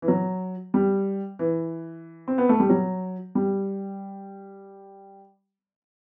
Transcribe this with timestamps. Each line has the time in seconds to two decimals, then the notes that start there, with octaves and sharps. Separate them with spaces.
0.02 E3
0.08 F#3
0.74 G3
1.39 E3
2.28 C4
2.38 B3
2.49 A3
2.60 G3
2.70 F#3
3.35 G3